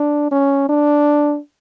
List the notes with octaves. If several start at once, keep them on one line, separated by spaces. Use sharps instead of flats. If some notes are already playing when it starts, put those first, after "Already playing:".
Already playing: D4
C#4
D4